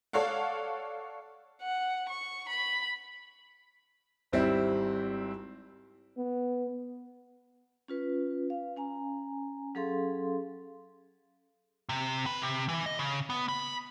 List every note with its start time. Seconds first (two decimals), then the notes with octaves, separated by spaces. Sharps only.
0.13 A4 C#5 D5 F5 F#5
1.62 F#5
2.09 C#6
2.49 B5
4.32 G#1 G3 C4 E4
6.17 B3
7.88 C#4 F4 B4
8.50 F5
8.76 C#4 G#5 A#5
9.75 F#3 C#4 G#4 A4 F5 C6
11.89 C3
12.26 B4
12.42 C3
12.69 E3
12.86 D#5
12.99 C#3
13.30 B3
13.49 B5